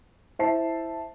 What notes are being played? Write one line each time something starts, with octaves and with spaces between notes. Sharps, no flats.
E4 C5 E5 A5 C7